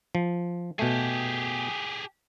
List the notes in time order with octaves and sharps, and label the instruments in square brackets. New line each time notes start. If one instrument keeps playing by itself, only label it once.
[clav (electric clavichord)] F3
[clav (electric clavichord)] B2 A3 [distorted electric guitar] G4 G#4